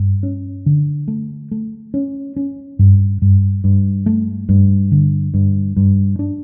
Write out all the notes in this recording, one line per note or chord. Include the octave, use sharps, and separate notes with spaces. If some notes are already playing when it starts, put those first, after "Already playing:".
Already playing: G2
C#4
D3
A3
A3
C#4
C#4
G2
G2
G2
A3
G2
D3
G2
G2
D4